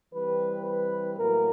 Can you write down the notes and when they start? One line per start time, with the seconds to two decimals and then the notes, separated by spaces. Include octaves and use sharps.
0.13 E3 G3 C4 B4
0.66 B4
1.17 A2 F#3 A#3 A#4